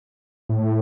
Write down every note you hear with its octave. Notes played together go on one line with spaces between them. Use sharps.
A2